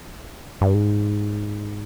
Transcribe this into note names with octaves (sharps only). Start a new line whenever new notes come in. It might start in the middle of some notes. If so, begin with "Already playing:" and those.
G2
G#2